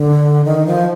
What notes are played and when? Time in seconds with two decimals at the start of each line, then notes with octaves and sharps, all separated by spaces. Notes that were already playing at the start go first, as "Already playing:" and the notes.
Already playing: D3
0.45 D#3
0.67 F3